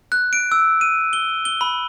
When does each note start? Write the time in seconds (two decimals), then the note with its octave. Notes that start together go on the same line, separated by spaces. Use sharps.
0.12 F#6
0.33 D7
0.52 E6
0.81 D#7
1.13 G7
1.45 G7
1.61 B5